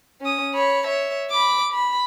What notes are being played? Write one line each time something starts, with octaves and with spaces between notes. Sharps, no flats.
C#4 D#6
C#5 B5
C#5 E5
B5 D6
B5